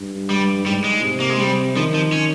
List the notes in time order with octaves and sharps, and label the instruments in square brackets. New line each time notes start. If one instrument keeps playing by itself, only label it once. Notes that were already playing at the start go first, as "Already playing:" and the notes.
Already playing: [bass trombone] G2
[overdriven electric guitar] G3
[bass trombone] G#2 [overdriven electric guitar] G3
[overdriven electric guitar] G#3
[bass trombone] C3
[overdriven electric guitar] A#3
G#3
[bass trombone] C3 [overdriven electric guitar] G3
[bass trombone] D#3 [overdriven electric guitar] F3
[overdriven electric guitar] F3
C#4